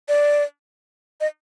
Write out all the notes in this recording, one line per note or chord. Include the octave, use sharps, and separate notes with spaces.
D5
D#5